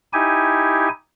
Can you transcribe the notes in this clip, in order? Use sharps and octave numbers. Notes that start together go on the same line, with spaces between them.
D#4 E4 G4 G#5